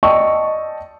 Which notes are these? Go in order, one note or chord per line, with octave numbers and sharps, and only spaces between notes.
D5 D#5 G5 A5 C#6 E6